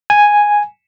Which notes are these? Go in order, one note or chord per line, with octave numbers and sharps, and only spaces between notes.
G#5